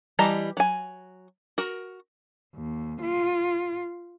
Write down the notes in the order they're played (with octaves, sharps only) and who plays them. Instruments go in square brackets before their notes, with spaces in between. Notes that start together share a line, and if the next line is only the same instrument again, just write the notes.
[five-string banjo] E3 G3 D#5 A5 A#5
F#3 G#5
F#4 A#4
[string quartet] D#2
F4